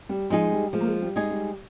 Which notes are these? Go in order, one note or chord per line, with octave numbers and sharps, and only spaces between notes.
G3
F3 G#3 D#4 G#4
G3
F3 G#3
A#3
G#3
G3
G#3 D#4 G#4
G3